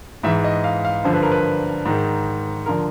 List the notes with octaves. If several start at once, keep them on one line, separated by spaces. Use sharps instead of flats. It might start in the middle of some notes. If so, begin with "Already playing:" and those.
G#2 E3 E5
D#5
F5
F5
G2 D3 F3 C5
B4
A#4
B4
G#2 D#3
D3 F3 A#4